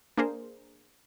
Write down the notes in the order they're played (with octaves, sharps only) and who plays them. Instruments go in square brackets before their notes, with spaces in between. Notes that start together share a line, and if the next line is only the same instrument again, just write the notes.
[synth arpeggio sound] A#3 D4 G#4 A#4 C5